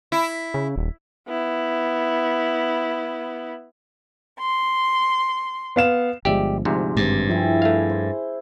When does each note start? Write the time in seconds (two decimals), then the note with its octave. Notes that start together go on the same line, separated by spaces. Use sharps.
0.12 E4
0.54 C#3
0.76 D#1
1.28 B3 E4
4.40 C6
5.76 B3 F5 E7
6.25 G1 F3 G#3 G4 D5 E5
6.65 D2 G#2 C3 F3
6.97 G#1 G2
7.29 F3 E4 G4 G#4
7.62 A3 G#4 E5 F5
7.90 C5